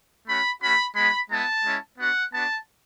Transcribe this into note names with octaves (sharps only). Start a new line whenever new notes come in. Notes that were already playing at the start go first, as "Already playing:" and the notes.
A3 C#4 F#4 B5
A3 C#4 F#4 B5
G#3 B3 F#4 B5
G#3 B3 E4 A5
G#3 C#4 E4
B3 D4 F#4 F#5
B3 D4 F#4 A5